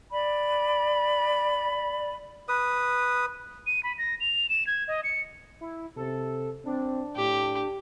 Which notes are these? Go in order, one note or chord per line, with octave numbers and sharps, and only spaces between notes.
D5 B5
B4 D#6
D#7
B5
A#6
F7
E7
G#6
D#5
C#7
E4
C3 A4
C4 D4
A2 G4